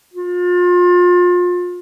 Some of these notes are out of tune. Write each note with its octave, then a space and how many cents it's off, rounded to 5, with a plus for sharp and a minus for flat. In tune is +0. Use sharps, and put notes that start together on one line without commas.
F4 +30